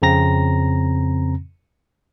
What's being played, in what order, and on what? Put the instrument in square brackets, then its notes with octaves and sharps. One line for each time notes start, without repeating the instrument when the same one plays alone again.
[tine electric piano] F2 C#3 C4 A#5 A#6